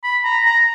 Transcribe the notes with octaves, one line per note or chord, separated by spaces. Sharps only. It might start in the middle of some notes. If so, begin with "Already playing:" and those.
B5
A#5
A#5